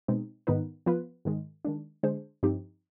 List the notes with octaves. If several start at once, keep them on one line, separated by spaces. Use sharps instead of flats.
B2 G#3 C4 D#4
G#2 D#3 B3 D#4 B4
F3 B3 F4 B4
G#2 D#3 G#3
D#3 G#3 D4
D3 G#3 D4 G#4 C5
G2 F3 C4 D#4 G4